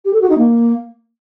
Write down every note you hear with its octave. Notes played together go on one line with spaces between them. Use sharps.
G4
A4
F#4
D#4
A#3